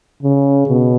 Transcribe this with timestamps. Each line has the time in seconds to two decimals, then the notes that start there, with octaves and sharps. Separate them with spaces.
0.22 C#3
0.68 B2